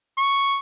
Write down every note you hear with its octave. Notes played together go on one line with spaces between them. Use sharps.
C#6